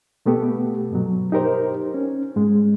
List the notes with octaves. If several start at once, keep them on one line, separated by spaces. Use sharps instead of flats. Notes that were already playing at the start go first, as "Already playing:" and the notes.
B2 A3 B3 G4 A4
G2 B2 F#3
D#4 G4 A#4 C5
C#4
G#2 G#3